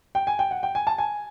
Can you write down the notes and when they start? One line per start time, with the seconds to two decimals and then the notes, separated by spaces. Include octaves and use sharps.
0.15 G5
0.27 G#5
0.39 G5
0.51 F#5
0.63 G5
0.75 G#5
0.87 A5
0.98 G#5